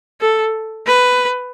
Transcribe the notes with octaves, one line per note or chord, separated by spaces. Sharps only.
A4
B4